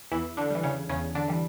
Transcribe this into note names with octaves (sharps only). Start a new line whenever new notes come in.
E2 E3 E4
D3 D4
E3 G3
C#3 C#4
E2 C#3 C#4
D3 D4
E3 G3